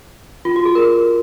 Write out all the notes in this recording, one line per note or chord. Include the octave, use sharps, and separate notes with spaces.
F4
F#4
G#4
A#4